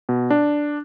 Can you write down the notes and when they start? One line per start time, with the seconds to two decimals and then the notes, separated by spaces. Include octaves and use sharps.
0.09 B2
0.30 D4